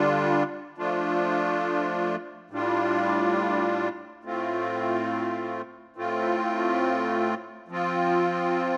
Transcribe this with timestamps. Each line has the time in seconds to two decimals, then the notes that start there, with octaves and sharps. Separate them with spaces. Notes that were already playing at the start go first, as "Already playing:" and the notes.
Already playing: D3 G3 D4 F4
0.78 F3 A3 D4 F4
2.50 A2 G3 D4 F4
4.24 A2 A3 C4 F4
5.96 A2 A3 C4 F4
7.68 F3 C4 F4